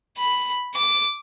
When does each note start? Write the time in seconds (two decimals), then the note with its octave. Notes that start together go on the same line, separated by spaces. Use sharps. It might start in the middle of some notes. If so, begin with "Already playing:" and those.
0.18 B5
0.75 D6